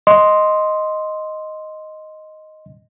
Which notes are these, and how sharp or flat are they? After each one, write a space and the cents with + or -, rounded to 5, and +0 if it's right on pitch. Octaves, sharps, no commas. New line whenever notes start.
D#5 +0 C6 +0